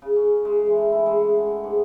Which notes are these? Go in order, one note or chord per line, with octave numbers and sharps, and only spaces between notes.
C#3
C#4
G#3
E3
A3
E4
G#3
F#5
A3
G#2